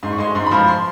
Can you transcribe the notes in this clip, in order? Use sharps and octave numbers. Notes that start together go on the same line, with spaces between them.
G#2 C6
C#6
G#3 C6
G#2 C6
B5
F3
B5
C6